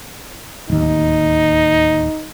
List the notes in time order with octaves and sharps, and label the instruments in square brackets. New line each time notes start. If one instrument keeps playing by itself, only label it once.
[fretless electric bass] D1 D#2 [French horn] D#4